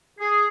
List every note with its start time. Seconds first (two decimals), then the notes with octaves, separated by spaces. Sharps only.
0.19 G#4